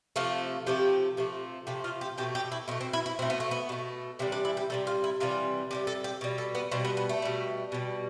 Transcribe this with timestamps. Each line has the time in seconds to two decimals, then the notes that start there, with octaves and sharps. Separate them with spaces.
0.16 C3 F3 A3 F4
0.67 C3 F3 A3 G4
1.17 C3 F3 A3
1.67 C3 F3 A3 G4
1.84 F4
2.01 G4
2.18 B2 A3 G4
2.35 G4
2.52 E4
2.68 B2 C4
2.71 A3
2.81 C4
2.93 E4
3.06 E4
3.19 B2 A3 C4
3.30 B3
3.40 A3
3.51 B3
3.69 B2 A3
4.19 C3 E3 G3 C4
4.32 D4
4.45 E4
4.57 G4
4.70 C3 E3 G3 A4
4.87 F4
5.04 E4
5.20 C3 E3 G3 F4
5.71 C3 E3 G3 G4
5.87 A4
6.04 G4
6.21 B2 G3
6.38 A4
6.55 B3
6.71 B2 G3 C4
6.85 B3
6.97 B3
7.09 A3
7.22 B2 G3
7.72 B2 G3